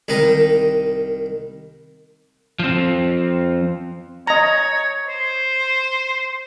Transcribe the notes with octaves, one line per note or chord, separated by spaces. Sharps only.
C2 D#3 B4 D#5 A#5
F3 C4
C#5 D#5 A#5
C5